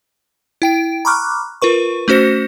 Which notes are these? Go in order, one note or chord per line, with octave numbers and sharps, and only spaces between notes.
E4 G5 D7
A#5 B5 C#6 D6 F6 F#6
F4 A#4 B4 C#6
A3 C#4 F#4 C5 A#6 C#7